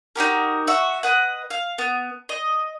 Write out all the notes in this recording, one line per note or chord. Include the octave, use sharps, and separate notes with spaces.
D#4 F#4 G4 A#4
F#4 E5 C#6
B4 D#5 F#5
F5
B3
D#5